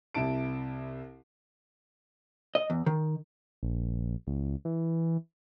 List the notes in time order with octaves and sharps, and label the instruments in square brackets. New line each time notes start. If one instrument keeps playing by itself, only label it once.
[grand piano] C2 C3 E4 A5 D7
[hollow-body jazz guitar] D#5
E2
D#3
[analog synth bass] A#1
C#2
E3